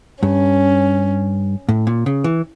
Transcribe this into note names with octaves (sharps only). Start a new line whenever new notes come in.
G2 C#4
A2
A#2
C#3
E3